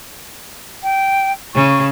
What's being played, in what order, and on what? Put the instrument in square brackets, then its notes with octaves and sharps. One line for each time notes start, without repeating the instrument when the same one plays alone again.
[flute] G5
[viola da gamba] C#3 [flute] C#6